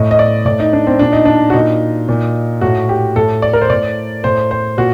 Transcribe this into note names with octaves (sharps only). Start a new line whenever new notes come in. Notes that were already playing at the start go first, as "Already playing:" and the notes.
Already playing: A2 D#5
D#5
D5
A2 D5
D#4
D4
C4
A#2 D4
D#4
D4
F#4
A#2 D#4
A#2
A2 F#4
G4
A2 A4
D5
A#4
C5
A2 D5
A2 C5
C5
A#2 F#4